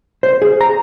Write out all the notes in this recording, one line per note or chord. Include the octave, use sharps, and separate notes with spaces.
C5
G#4
A#5